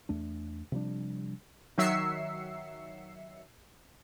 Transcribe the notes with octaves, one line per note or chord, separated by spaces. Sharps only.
E2 A3 D4
C3 F3 G3 D4
D#3 F#3 E5 E6 C7 C#7